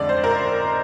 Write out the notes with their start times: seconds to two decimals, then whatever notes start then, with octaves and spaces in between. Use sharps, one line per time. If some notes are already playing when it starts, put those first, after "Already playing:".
Already playing: F2 D3 G#3 D5
0.09 C5
0.24 A#4
0.39 C5